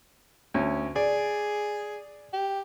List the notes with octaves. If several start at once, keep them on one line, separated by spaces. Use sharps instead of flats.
D2 C#4
G#4 D5
G4